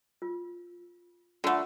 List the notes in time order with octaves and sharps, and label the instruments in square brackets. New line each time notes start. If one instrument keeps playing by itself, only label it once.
[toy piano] F4
[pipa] D3 A3 [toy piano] F4 F#5